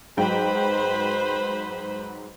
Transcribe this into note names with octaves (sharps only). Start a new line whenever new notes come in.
G#2 F#3 B4 C5 G5 B5